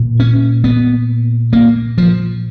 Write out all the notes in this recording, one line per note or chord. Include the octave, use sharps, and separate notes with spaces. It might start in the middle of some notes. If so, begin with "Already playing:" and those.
Already playing: A#2
C#4
B3
A#3
F3